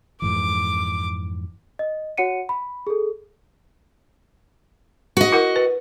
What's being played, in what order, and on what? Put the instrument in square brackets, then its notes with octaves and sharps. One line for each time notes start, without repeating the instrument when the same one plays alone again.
[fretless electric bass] F2 G#2 E3 [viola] D6
[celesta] D#5
F#4 C#5 F#5 C#7 D#7
B5
G#4 A4
[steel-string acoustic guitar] F#4 D#5
[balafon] E4 A#4 F#5
B4